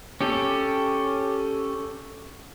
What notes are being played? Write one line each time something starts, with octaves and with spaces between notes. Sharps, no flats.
C#4 G4 A4